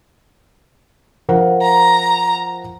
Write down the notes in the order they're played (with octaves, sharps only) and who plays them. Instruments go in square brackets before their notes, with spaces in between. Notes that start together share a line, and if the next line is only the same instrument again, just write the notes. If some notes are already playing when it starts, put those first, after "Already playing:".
[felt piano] F3 A#4 F#5
[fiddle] A#5